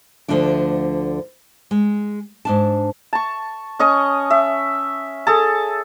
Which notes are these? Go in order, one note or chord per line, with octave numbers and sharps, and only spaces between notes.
D2 D3 F3 A3 D4 D5
G#3
G#2 D4 A5
A5 C#6
C#4 D#5 C#6 D#6
E5
G#4 A4 A5